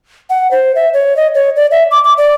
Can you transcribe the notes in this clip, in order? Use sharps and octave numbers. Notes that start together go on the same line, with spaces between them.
F#5
C5
E5
C#5
D#5
C#5
D5
E5
D6
D6
D5